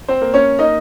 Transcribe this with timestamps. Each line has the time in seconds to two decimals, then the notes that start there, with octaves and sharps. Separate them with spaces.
0.08 C4 C5
0.22 A#3
0.34 C#4 C#5
0.59 A#3 D#4 D#5